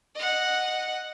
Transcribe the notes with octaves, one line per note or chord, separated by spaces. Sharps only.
D#5 F#5